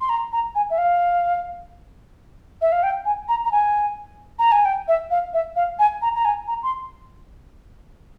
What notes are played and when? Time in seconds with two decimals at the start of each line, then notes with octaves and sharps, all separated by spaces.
0.01 C6
0.09 A#5
0.32 A#5
0.55 G#5
0.70 E5
0.78 F5
2.61 E5
2.72 F5
2.83 G5
3.05 G#5
3.28 A#5
3.45 A#5
3.52 G#5
4.39 A#5
4.52 G#5
4.65 G5
4.88 E5
5.11 F5
5.34 E5
5.56 F5
5.79 G#5
6.02 A#5
6.16 A#5
6.25 G#5
6.47 A#5
6.63 C6